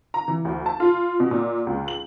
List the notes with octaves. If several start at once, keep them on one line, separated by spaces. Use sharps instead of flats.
A#5
E3
D2
A5
F4
B2
A#2
C#2
F#7